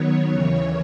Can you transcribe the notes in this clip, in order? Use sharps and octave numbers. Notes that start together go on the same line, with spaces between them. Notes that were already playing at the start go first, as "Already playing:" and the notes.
Already playing: D#3 F#3 B3 C#5
D#2 C#3 E3 C#5